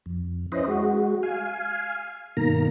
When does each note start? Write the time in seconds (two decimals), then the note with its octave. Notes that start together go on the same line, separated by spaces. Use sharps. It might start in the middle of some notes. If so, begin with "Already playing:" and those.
0.06 F2
0.52 C#4 E4 B4 C5 D#5
0.68 G#3 F#4
1.23 F5 G#5
2.37 G2 B2 D#3 A#3 A#5